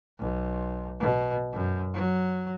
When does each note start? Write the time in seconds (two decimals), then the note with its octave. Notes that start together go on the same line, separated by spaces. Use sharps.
0.19 B1
1.00 B2
1.53 F#2
1.94 F#3